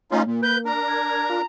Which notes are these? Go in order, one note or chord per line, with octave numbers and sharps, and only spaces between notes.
A3 C#4 D#4 F4
A#2 A#3
B4 G6
D4 A#4 A#5
G#6
F4